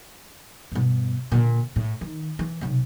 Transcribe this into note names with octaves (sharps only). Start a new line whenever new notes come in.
G2 B2
A#2 D3
A2
D#3
E3
B1 C3